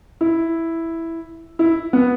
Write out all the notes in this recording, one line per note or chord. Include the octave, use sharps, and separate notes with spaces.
E4
E4
B3